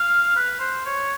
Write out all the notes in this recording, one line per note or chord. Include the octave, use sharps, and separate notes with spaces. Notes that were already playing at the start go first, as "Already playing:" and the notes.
Already playing: F5
B4
C5
C#5